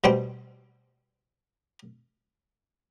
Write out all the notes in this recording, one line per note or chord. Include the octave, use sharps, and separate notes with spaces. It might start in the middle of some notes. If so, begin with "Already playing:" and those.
B2 G3 C5 G5